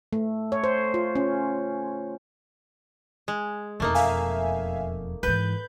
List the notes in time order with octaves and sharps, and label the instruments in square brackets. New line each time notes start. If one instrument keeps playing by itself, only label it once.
[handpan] A3
C#5
C5
F4
C#4
[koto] G#3
[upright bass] E1 F2 [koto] A3 A#3 D#4
[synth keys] E5 F5 G#5
[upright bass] G#2 E3 [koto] B4 [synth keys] G6